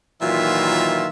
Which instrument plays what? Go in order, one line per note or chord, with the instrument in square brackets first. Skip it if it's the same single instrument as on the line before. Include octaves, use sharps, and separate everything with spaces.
[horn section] A#2 D#3 E3 F#3 F4 E5